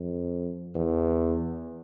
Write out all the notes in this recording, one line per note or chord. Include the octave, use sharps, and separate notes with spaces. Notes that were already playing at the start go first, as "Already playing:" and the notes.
Already playing: F2
E2